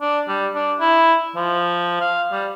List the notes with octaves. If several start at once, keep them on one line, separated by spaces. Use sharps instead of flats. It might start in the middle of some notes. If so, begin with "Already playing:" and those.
D4
G3
D4
E4
F3
F5
G3